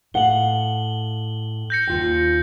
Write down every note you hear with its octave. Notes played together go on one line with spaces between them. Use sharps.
A2 F5 F#5 F#7 G7
G6 A#6 C#7
D#2 F4 G5